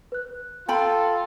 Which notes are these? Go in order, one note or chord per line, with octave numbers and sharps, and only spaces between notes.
B4 F#6
F4 A4 G5 B5